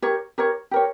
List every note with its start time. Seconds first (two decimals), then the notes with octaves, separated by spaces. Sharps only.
0.02 G4 A#4 C#5
0.38 G4 A#4 C#5
0.71 G4 A#4 C#5